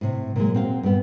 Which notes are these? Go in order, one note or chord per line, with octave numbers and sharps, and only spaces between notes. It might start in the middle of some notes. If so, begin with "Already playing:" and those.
A2 C3
A#2 F#3 G#3
C4 F#4 F5
G2 B3